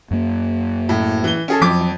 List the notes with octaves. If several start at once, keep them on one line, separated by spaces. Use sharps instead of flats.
F#2 A#3
A2
E3 G7
C#4 G#4 A4
F2 F3 F#3 D6 B6